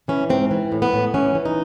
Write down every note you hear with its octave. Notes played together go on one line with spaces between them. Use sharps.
E3 C#4
G#2 C4
E3
A2
B3
A2
E3 C#4
E3
D#4